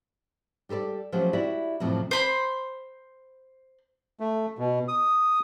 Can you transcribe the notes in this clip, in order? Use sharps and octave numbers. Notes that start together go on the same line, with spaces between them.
G3 G4 A4 B4 D5
F3 F#3 A3 C#4 G4
E4 F#4 G4 D5 E5
F2 A2 C3 F3 F#3
C5 B5 C6
A3
B2
D#6